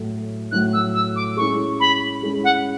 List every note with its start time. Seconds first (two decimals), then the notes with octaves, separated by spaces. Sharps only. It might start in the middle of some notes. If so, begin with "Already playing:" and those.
Already playing: A2 F#3 A3
0.52 A2 F#3 A3 F#6
0.73 E6
0.94 E6
1.16 D6
1.37 G#3 C#4 E4 G#4 C#6
1.80 B5
2.22 G#3 C#4 E4 G#4
2.44 F#5